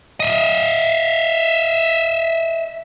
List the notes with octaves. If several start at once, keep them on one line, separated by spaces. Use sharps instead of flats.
D#5 E5